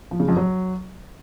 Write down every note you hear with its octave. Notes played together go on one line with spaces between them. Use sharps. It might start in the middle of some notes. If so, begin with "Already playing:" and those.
F3
C#3
F2
F#3